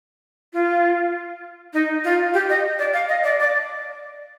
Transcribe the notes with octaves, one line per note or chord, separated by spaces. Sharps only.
F4
D#4
F4
G4
D#5
D5
F5
D#5
D5
D5